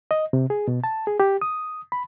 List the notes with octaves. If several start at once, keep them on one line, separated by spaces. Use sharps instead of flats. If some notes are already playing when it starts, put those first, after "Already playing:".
D#5
C3
G#4
B2
A5
G#4
G4
D#6
B5